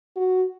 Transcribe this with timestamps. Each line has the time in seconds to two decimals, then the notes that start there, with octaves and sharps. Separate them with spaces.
0.17 F#4